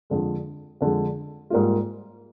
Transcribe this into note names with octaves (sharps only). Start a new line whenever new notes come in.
F2 D3 G#3
F2 D3 G#3
G#2 G3 A#3 F4